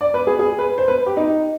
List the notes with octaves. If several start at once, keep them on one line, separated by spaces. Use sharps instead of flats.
D5
B4
G#4
G#4
B4
C5
B4
G4
D#4